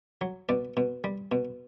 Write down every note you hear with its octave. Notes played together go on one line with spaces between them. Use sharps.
F#3
B2 D5
B2
G3
B2